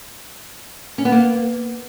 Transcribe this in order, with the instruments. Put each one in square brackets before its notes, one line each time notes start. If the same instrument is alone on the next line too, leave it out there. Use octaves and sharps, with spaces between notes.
[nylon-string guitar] C#4
B3
A#3